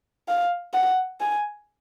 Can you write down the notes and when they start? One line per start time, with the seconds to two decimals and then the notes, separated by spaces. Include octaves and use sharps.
0.28 F5
0.74 F#5
1.21 G#5